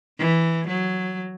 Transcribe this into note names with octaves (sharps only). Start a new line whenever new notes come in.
E3
F#3